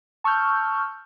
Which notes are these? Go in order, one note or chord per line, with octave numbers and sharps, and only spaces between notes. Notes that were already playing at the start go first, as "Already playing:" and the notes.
A5 C#6 E6 F6 G6